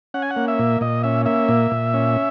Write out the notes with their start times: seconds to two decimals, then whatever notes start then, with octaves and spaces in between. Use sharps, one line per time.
0.14 C#4 F#5
0.22 G#5
0.30 F#5
0.36 A#3
0.48 E5
0.59 A#2
0.81 A#2 D#5
1.03 C#4 E5
1.26 A#3 E5
1.49 A#2
1.71 A#2
1.94 C#4